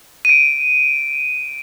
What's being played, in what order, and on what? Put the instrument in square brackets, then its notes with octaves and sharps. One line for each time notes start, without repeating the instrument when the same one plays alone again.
[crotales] D7 D#7